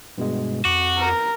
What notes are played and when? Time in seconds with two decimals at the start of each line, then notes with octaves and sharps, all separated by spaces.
0.18 G2 B2 G#3
0.65 F2 F#4 D6
0.98 A#4